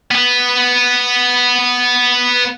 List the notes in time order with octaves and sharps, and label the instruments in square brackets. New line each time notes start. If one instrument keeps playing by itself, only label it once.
[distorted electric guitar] B3 B4